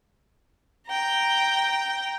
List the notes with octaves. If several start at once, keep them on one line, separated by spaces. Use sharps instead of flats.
G5 A#5